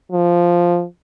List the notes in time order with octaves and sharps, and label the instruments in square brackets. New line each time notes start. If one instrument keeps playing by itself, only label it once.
[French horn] F3